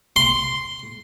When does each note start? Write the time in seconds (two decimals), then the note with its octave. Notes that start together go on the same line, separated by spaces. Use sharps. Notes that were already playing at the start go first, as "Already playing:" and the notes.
0.16 C6